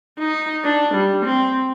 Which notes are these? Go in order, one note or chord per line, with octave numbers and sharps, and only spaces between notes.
D#4
D4
G3
C4